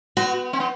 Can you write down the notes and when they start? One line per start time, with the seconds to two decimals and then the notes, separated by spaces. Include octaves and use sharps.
0.17 B3 F#4
0.53 C4
0.60 B3